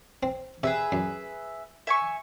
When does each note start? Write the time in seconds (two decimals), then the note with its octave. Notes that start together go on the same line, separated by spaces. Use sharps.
0.23 C4
0.63 C3 G#4 B4 E5
0.92 F#2
1.87 E5 G#5 C#6